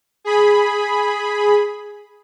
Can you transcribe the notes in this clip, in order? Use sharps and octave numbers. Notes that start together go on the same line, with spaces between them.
G#4 B5